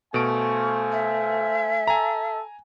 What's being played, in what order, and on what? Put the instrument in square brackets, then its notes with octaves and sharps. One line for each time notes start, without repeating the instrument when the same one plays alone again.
[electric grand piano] B2 D7 [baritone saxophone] A3 [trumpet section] C5 F5 G#5 [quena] C#6
[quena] E5
[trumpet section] A4 [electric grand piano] G#5 A#5